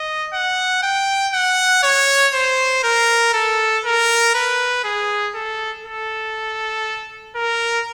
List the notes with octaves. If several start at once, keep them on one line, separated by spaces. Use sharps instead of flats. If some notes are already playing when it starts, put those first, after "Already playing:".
Already playing: D#5
F#5
G5
F#5
C#5
C5
A#4
A4
A#4
B4
G#4
A4
A4
A#4